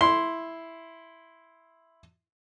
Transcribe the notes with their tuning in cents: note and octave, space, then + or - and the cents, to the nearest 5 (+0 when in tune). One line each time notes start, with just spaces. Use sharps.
E4 +0 C6 +0